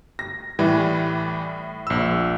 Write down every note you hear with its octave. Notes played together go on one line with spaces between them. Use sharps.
A#6
A2 E3 G3
A#1 E6